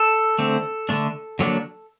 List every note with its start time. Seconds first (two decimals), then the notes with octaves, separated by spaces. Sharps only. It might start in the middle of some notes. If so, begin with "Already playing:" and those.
Already playing: A4
0.38 D3 A3 C4
0.89 D3 A3 D4
1.39 D3 F#3 A#3 D4